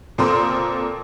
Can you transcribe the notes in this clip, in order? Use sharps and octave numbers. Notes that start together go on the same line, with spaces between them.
A#2 C4 A4 A#4 C6 D#6